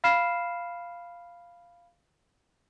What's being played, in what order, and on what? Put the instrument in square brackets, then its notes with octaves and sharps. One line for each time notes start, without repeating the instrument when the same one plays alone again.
[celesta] F5 B5 F6 C7 E7